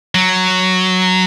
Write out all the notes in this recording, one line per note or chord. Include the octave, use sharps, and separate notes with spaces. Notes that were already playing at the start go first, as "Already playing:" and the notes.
F#3